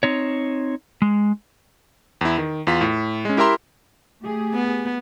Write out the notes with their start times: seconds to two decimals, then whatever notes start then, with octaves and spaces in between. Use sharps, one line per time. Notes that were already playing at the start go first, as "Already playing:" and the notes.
0.03 C4 D#4 C#5
1.02 G#3
2.21 E2 E4
2.38 D#3
2.67 E2 F4 B6
2.81 A2
3.25 G#3 C#4
3.37 E4 G4 A#4 E5 A#5 C6
4.20 A3 G4 G#4
4.54 B3